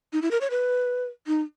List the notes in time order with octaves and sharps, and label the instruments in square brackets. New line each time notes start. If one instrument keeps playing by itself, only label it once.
[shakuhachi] D#4
E4
A#4
C#5
B4
D#4